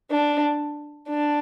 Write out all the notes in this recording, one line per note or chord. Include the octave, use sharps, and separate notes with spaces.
D4
D4